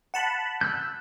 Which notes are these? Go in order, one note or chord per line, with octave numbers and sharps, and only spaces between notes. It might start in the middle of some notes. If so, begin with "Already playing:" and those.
F#5 A5 B5
E6 F#6 G6